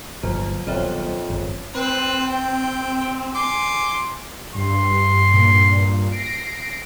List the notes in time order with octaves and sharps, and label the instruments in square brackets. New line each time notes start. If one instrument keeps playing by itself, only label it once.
[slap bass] G1 A#2 F3 [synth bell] F#3 F4 C5
[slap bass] D#1 B1 [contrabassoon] F2 [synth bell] C5 C#5 E5
[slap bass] G#1 F#2
[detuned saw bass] C4 [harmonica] B4 C5
[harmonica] G5
G#5 C6 D6
[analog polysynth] G2 [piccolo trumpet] C6
[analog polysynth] G2 A#2
A#6 C7 D7